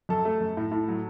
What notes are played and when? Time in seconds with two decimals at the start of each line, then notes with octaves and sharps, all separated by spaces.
0.09 F#2 A4
0.25 A3
0.40 F#2
0.57 A2
0.72 A2
0.88 F#3